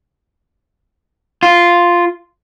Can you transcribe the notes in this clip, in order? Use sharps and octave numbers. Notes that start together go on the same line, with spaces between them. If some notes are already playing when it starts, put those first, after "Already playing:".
F4